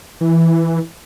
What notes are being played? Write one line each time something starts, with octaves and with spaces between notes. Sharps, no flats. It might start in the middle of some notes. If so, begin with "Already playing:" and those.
E3